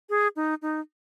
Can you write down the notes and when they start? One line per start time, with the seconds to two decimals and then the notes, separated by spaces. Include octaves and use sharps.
0.10 G#4
0.36 D#4
0.62 D#4